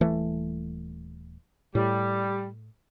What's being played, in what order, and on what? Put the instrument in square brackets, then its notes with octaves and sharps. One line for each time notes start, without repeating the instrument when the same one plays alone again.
[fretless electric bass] D#1 E3 A3
[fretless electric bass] A2 [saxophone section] G3